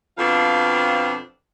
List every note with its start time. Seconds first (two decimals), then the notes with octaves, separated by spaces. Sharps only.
0.18 F2 B2 C4 D4 F4 F5